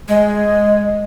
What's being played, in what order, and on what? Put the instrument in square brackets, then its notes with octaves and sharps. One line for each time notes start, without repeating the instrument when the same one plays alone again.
[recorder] G#3